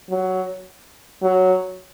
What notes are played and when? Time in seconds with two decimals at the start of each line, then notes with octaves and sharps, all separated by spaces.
0.11 F#3
1.23 F#3